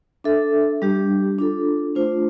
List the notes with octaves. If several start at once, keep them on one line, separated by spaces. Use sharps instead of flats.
D4 A4 E5
G3 D4 G4
D4 F4 A4
A3 D4 F4 C5